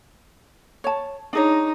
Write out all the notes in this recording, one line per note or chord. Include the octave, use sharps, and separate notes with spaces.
C#5 A5
D4 D#4 G#4 C#5